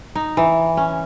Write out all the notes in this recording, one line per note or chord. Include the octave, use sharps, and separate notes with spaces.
D#4
E3
C#4